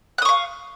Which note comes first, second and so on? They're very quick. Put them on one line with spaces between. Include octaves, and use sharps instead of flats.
F#6 D#6 C#6 F5